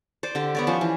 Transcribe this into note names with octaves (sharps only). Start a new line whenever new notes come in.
C5 D5
D3 G4
B3 C#5 D5
F3 C#4 C5 C#5
E3